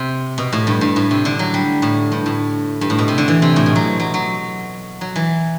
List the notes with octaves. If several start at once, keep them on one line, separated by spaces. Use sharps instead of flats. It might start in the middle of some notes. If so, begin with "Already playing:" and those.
Already playing: C3
B2
A2
G2
G2
A2
C3
D3
F#3
G3
A2
G2
A2
G2
A2
B2
C3
D3
E3
C3
A2
B2
F#3
F#3
F#3
F#3
E3